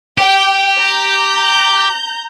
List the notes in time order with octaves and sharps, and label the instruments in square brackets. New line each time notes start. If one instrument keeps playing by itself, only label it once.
[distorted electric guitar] G4 [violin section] G5
[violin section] A#5 G6